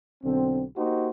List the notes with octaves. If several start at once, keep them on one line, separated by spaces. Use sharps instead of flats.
B1 D3 C4
A#3 D#4 F#4 G4 C5